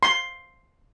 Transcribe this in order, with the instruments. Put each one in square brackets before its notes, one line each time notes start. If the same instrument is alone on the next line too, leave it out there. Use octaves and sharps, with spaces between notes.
[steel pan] C6